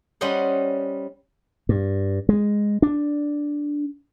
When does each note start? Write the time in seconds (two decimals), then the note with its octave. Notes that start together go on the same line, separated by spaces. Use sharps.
0.21 G3 C#4 C5 D#5 F#5 C6
1.69 G2
2.29 G#3
2.82 D4